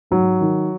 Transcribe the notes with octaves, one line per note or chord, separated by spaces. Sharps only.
G#2 F#3
D#3